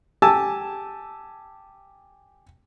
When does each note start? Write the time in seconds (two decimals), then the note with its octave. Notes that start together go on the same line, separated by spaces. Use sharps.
0.22 G4 G#5 A5 E6